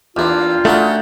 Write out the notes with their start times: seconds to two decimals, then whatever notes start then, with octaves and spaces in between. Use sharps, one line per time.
0.17 E2 A#3 D4 E4 F4 G4
0.41 F5
0.65 D3 A3 C#4 D#4 F#4 G5 A5